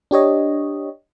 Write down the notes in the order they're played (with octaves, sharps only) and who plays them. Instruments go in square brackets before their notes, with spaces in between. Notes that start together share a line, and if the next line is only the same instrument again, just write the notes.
[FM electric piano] D4 G4 C#5 D#5